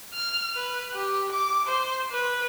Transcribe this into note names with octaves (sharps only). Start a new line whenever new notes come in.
F6
B4
G4
D6
C5
B4